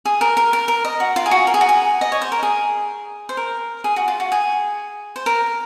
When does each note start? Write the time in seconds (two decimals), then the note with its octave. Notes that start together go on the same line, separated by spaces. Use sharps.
0.05 G#4
0.21 A#4
0.37 A#4
0.53 A#4
0.68 A#4
0.85 D#5
1.00 F#4
1.16 F4
1.26 G#4
1.31 F#4
1.47 A#4
1.54 G#4
1.61 F#4
1.69 G#4
2.01 D#5
2.12 C#5
2.22 C5
2.32 A#4
2.43 G#4
3.29 C5
3.37 A#4
3.84 G#4
3.96 F#4
4.08 F4
4.20 F#4
4.32 G#4
5.16 C5
5.26 A#4